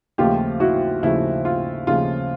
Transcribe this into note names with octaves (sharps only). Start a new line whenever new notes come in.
D#2 C#3 F3 A3 F4 G4
E4 F#4
D#2 C#3 F3 A3 E4
F4
D#2 C#3 F3 A3 F4